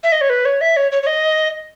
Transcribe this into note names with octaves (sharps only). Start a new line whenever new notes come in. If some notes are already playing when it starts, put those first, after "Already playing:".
E5
D#5
C#5
B4
C#5
E5
C#5
C#5
C#5
D#5